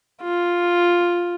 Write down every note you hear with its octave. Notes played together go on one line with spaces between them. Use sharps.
F4